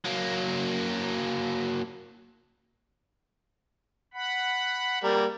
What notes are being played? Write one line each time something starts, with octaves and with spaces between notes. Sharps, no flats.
F#3 A#3
F#5 B5
G3 A#3 A#4